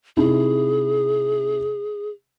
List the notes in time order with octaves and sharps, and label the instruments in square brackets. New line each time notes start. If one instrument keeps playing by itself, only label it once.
[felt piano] C3 D#4 E4 [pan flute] G#4